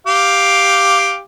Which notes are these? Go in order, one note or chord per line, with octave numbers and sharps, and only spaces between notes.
G4 F5